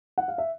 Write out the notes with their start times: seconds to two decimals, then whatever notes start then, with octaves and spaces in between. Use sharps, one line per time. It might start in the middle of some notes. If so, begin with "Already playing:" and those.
0.18 F#5
0.28 F5
0.38 E5